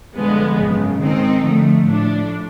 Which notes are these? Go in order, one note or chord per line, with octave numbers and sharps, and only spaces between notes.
G2 D3 F3 G#3 B3
G#1 F#2 C#3
D#3 G#3 C4 D#4
D3 F3 A3
A2 F3 A3 D4